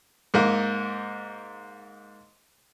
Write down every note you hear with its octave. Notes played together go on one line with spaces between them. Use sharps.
G#2 A#3